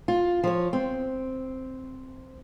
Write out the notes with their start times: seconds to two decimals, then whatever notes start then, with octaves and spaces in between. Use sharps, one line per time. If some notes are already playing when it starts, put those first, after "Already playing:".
0.08 F4
0.44 F3 C#5
0.73 C4